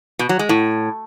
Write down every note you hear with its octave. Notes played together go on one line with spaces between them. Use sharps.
B2
F#3
G#3
A2